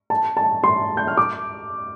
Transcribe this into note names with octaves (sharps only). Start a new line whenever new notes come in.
A5
A5
C6
G6
F6
D6